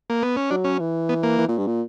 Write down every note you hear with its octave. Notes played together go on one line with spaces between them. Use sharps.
A#3
B3
C#4
F#3 D4
C#4
E3
B3
A#3
E3
A#2
G2
A#2